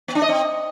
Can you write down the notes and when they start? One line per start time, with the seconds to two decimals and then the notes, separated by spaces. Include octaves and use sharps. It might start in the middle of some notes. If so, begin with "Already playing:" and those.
0.08 B3
0.15 D4
0.22 D#5
0.29 C4